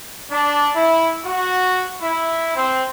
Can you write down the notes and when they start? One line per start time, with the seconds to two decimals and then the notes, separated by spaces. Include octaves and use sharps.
0.32 D4
0.75 E4
1.26 F#4
2.02 E4
2.56 C4